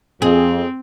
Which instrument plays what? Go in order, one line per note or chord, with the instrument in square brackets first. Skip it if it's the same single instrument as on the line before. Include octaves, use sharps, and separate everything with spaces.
[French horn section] F2 [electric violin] C4 [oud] G#4